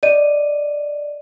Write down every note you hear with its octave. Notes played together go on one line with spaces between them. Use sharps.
D5 D#5 D#7